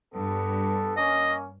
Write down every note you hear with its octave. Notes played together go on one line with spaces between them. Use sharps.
G2 B3 A4
A#3 C#4 D#5